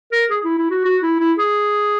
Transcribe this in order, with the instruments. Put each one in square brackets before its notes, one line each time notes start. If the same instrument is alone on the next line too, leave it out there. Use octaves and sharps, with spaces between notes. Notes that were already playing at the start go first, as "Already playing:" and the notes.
[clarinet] A#4
G#4
E4
E4
F#4
F#4
E4
E4
G#4